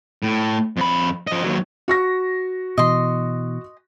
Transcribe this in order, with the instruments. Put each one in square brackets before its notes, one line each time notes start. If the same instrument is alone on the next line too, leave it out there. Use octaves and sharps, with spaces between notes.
[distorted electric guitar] A2
F2 B5
F3 D#5
D#2 F#3
[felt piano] F#4 C#6 A#6
[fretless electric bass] B2 E3 [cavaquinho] D#5 C6